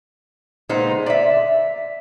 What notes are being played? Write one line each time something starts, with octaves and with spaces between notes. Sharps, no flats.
A#2 G#3 B3 D#4 C5
D5 E5